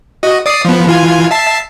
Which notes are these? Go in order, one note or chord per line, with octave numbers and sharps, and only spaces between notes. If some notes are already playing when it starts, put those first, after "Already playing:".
F#4 D#5
D5 D#6 C7
F3 B3
E3 F4 G#5
E5 A5 C7